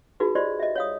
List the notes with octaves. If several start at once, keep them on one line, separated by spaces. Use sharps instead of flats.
D#4 F4 F#4 G#4 B4
F4 G4 C5 D5 D#5 C6
D#5 E5
C#5 F5 D#6